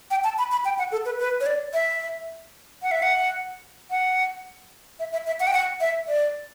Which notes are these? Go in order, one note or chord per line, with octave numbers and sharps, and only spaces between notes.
G5
A5
B5
B5
G5
F#5
A4
B4
B4
C#5
D5
E5
F#5
E5
F#5
F#5
E5
E5
E5
F#5
G5
F#5
E5
D5